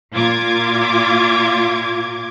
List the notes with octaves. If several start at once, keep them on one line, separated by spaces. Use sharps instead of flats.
A#2 F4 D6 G#6